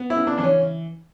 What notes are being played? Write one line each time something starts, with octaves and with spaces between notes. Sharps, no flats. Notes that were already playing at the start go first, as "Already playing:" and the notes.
Already playing: B3
E4
C#3
D4
E3 D4
C#4